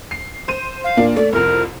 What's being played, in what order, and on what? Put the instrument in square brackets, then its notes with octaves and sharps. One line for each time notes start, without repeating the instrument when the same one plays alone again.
[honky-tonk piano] C7
C5 D#7
[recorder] F5
[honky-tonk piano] A#2 A#3 D4
[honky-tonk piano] A3 [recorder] D5
[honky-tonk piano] C2 F2 [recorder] A#4